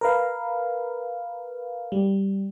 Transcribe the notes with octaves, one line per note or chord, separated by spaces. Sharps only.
A#4 B4 F5
G3